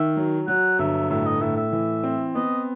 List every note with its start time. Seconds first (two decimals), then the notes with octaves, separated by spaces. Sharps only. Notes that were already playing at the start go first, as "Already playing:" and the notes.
Already playing: D#3 E5
0.17 F#3
0.47 F#3 F#5
0.79 G1 E5
1.10 A2 E5
1.26 D#5
1.41 A2 E5
1.57 E5
1.73 E3
2.04 C4
2.35 B3 D#5